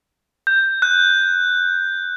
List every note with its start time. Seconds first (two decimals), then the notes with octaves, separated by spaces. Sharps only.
0.47 G6
0.82 F#6